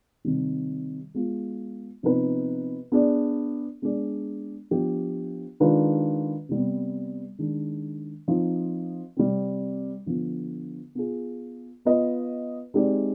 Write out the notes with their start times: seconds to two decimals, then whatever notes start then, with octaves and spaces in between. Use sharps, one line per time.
0.24 C3 D#3 G3
1.14 G#3 B3 F4
2.03 C3 F3 B3 D#4 B4
2.92 B3 D4 G#4 D5
3.82 G#3 B3 D4 G#4 D5
4.71 F3 B3 D4 G4
5.60 D#3 G#3 D4 F4 B4
6.49 C3 G3 B3
7.39 D#3 G#3 D4
8.28 F3 C4 D#4
9.17 C3 G3 C4
10.06 D3 F3 B3
10.95 B3 F4 G#4
11.85 B3 F4 B4 D#5
12.74 G#3 C4 D#4 G4 D5